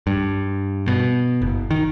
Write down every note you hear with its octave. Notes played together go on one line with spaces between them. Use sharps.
G2
B2
F#1
D#3